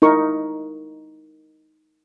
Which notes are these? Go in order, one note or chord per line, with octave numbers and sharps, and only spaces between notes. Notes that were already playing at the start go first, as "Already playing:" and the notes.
D#4 E4 A#4 C#6